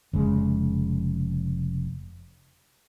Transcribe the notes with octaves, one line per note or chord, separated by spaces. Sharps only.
F1 C#3 G#3